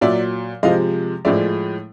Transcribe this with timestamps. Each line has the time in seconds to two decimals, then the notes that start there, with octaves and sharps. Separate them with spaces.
0.01 A#2 F#3 D5 E5
0.63 C3 F3 G#3 D#5 F5
1.25 A2 F3 G#3 D5 E5